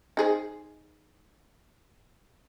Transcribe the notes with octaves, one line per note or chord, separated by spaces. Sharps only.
D#4 G#4 C5